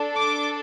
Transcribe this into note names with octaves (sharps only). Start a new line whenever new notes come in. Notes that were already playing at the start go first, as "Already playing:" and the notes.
Already playing: D4 A4
D6